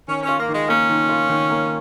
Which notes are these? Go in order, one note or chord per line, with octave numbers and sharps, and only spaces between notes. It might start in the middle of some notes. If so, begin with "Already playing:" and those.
D#3 C#4
C#4
F4
A#3
D#3 G#3
A#3 C#4
D#3
F4
D#3
A#3